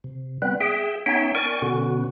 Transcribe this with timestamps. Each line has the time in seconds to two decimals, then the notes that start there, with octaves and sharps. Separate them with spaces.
0.04 C3
0.42 G3 B3 C4 B4
0.61 G#4 E5 G5
1.06 B3 C#4 D#4 C#5 E5 G5
1.35 A#4 D5 G5 G#5 C#6
1.62 B2 D3 B3 C#4 F#4